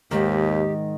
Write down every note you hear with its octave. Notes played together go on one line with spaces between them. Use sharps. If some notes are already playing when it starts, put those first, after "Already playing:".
D#2 G#2 D#3 G4